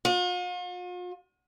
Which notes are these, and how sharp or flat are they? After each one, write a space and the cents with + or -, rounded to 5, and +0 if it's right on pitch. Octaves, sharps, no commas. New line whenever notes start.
F4 +45